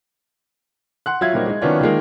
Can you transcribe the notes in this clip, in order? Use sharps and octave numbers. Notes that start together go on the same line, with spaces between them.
F#5 C6 F#6
F#3 F4 E5 G#6
A#2 F#3 G3 A#3 C4 D#4
G#3 D#4
D#3 F#3 B3 C#4 D4 F4
D#3 F3 G#3 A#3